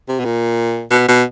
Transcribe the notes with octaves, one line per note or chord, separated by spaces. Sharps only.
C3
B2
A#2
B2
B2